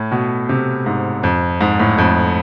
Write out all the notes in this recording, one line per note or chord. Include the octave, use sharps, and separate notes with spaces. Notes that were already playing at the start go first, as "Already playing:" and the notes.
Already playing: A2
B2
C3
G#2
F2
G#2
A2
F2